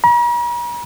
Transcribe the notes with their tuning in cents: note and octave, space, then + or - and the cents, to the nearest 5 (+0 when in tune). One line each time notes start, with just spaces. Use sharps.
A#5 +45